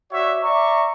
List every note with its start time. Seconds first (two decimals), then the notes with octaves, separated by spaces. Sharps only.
0.10 F#4 C#5 D5 E5
0.41 D5 E5 A#5 C#6